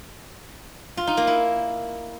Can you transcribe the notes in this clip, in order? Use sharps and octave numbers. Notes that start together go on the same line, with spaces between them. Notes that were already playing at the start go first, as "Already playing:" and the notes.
F4
D#4
A#3
E4